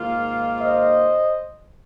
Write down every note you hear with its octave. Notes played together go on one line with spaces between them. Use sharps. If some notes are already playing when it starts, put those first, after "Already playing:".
Already playing: G#2 D#3 A#3 F4
C5 D#5